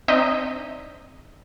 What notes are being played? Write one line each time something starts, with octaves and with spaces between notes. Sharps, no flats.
C4 D4 D#4 D#5 E5